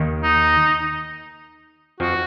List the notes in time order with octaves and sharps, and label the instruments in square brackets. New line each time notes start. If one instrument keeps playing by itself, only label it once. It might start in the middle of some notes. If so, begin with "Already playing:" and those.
Already playing: [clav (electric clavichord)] D#2 D#3
[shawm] D#4
[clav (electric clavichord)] F2 F3 [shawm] F#4